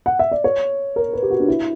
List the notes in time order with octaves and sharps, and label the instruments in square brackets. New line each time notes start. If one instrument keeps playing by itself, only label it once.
[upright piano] F#5
E5
D5
C#5
A#4
B4
G4
F#4
D4
E4